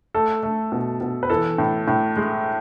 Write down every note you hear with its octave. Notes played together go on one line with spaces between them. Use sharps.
A3 A4
A3
B2
B2
B4
E3 A4
A2
A2
G#3